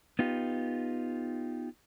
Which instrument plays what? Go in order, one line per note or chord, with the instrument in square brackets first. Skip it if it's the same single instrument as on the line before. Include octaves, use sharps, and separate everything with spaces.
[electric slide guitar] B3 D#4 F4 G4